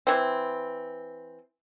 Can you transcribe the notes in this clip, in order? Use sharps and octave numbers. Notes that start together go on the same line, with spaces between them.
E3 C4